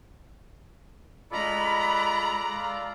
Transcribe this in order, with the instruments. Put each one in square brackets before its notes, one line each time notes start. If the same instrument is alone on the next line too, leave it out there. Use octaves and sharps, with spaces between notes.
[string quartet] G#3 A#5 F#6 [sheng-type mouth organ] F4 A4 D5 [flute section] D#5 B5